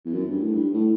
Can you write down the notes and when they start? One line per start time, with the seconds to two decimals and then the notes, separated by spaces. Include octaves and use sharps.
0.05 E2
0.13 F#2
0.29 G2
0.40 A2
0.53 G2
0.74 A2